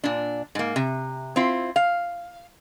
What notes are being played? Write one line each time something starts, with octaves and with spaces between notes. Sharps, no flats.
A#2 D4
G#2 A#3
C3
C4 E4 F4
F5